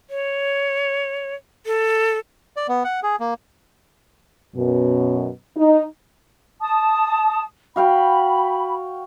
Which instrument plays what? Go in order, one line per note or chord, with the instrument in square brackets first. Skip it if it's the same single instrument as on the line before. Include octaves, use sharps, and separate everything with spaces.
[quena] C#5
A4
[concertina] D5
B3
F#5
G#4
A#3
[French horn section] F#2 B2
D#4
[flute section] A5 D#6
[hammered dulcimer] F#4 F5 G5 [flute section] B5